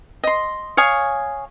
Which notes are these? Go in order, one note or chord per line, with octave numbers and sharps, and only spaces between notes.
D#5 C6
C#5 F5 G#5 D#6